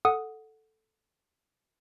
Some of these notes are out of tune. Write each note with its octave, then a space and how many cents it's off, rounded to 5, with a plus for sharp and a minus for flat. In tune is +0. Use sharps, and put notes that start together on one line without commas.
A4 +0 F#5 -5 D#6 +0